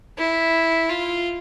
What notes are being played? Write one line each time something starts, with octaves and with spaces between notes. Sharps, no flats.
E4
F4